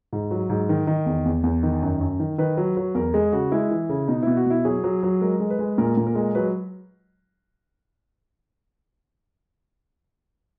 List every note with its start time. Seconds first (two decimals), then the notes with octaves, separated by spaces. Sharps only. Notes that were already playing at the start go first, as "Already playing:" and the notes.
0.13 G#2
0.31 F#3
0.49 G#2
0.69 D#3
0.87 D#3
1.06 E2
1.25 E2
1.44 E2
1.63 D#3
1.82 F#2
2.01 F#2
2.20 D#3
2.38 D#3 B4
2.57 F#3
2.77 F#3
2.95 E2 A#4
3.14 G#3 G#4
3.33 C#3 F#4
3.52 G#3 E4
3.71 E3
3.89 C#3
4.08 B2 D#4
4.23 B2 E4
4.37 F#4
4.46 B2 E4
4.65 F#3 G#4
4.84 F#3
5.03 F#3
5.21 G#3 A#4
5.40 G#3
5.50 B4
5.59 G#3
5.78 A#2 A#4
5.97 A#2
6.07 A#4
6.15 G#3
6.35 F#3 B4